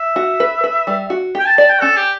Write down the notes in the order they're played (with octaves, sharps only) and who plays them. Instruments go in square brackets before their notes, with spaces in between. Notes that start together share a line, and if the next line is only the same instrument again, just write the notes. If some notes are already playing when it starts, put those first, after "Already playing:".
Already playing: [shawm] E5
[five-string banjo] F#4
B4
B4
G3
F#4
[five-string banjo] G4 [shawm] G5
[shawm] A5
[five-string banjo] D5 [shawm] A5
[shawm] G5
[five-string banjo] C#4 [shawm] A4
[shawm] G4